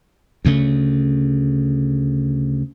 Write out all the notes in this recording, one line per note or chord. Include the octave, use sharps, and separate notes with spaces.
D2 C#3 A3